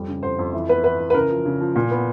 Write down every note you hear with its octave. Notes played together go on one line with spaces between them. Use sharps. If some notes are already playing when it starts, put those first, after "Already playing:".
Already playing: F2 G3
C#3
F2 C5
F2
E3
B3 B4
E3 B4
E3
B4
C#3 A#4
F3
C#3
F3
A#2
B3